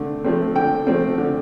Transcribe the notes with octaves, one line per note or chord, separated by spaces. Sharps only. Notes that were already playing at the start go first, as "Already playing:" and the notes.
Already playing: D3 A3 C4
F3 A3 C4
D3 G5
F3 A3 C4
D3